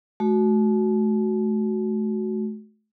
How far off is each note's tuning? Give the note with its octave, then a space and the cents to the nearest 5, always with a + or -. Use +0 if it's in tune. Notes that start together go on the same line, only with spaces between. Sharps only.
A3 -40 F#4 +0